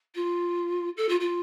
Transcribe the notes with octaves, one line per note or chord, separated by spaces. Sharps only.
F4
A4
F4
F4